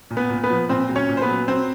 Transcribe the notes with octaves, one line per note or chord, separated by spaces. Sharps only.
A#2
B3 B4
A#2
B3 B4
F3
A#2 C4 C5
F#3
C#4 C#5
A#2
C5
B3 B4
F#3
F#3 C4 C5